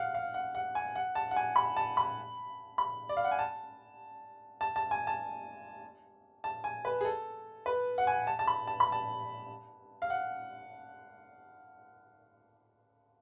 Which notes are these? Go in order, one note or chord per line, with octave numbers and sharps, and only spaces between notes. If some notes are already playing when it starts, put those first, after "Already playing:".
Already playing: F5 F#5
F5
F#5
F#5
G#5
F#5
A5
F#5
G#5
B5
A5
B5
B5
D5
F5
F#5
G#5
A5
A5
A5
G#5
A5
A5
G#5
B4
G#4
A4
B4
F#5
G#5
A5
A5
B5
A5
B5
A5
F5
F#5